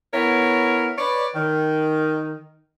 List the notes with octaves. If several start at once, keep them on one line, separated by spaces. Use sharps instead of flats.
B3 E4 A#4 C#5
B4 C#5 D5
D#3